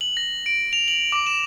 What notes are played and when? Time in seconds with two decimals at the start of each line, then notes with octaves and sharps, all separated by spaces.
0.01 F#7
0.17 A#6
0.46 D7
0.73 F7
0.88 F#7
1.12 D6
1.27 E7